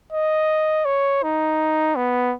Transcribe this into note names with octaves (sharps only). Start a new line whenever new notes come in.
D#5
C#5
D#4
B3